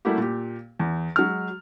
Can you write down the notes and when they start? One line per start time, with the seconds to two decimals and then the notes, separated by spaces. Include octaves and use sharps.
0.05 G3 A3 A#3 E4 F#4 G4
0.18 A#2 G4
0.79 E2
1.16 F#3 G#3 F6